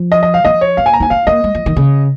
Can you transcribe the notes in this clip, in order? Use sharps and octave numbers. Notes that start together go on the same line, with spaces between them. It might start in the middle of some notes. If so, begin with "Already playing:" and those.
Already playing: F3
D#5
D#5
F5
F3 D#5
C#5
A#3 F5
G#5
A#5
D#4 G#5
C#4 F5
A#3 D#5
G#3
F3
D#3
C#3